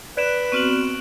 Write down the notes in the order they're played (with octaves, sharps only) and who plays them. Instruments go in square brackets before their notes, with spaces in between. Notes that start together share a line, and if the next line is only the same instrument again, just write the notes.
[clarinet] B4 [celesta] D5 [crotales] F#6 D7 E7
[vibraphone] B3 C4 F#4 [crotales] C#6 F6 F#7